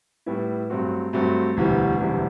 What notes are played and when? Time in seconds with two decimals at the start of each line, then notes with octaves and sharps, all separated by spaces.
0.26 A2 G3 B3 E4
0.70 G2 F#3 A3 C4 F#4
1.13 G2 F#3 A3 C4 F#4
1.57 E1 D2 C3 E3 G3
2.00 E1 D2 C3 E3 G3